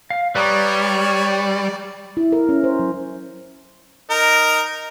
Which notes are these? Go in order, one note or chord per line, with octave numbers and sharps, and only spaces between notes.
F5
G3 B4 C#5 D5 A#5 D#6
E4
A#4
C#4
C5
F#3
D#4 A#4